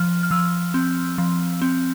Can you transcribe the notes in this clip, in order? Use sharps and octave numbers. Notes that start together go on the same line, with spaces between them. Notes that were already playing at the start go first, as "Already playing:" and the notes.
Already playing: F3 F6
F6
F3 E6
C4
F3
C4